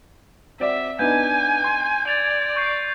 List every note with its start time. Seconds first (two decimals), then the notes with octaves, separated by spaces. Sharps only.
0.60 C4 F#4 D5 E5
0.99 B3 D4 D#4 G#5 G6
1.64 C6
2.07 D5 G#6 A6 F7
2.56 C#6 G6 C7